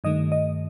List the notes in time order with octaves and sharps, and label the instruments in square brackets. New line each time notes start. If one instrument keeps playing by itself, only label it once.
[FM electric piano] G2 D#3 A3 D#5
D#5